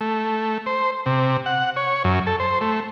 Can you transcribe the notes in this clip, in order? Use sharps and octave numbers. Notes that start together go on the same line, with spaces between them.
A3
C5
C3
F#5
C#5
F#2
A4
C5
A3